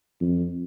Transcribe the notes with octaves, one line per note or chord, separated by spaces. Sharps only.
F2